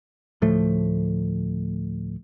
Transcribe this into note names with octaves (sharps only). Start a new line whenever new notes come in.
D2 A2 F3 A3